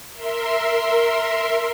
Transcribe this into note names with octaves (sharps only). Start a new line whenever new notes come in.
A#4 E5 C6